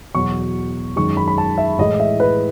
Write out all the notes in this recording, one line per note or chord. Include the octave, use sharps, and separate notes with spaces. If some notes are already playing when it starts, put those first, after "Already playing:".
E2 B2 F#3 C#6
F#2 D#3 G#3 C#6
B5
B5
A5
E5
A2 E3 G#3 D#5
E5
B4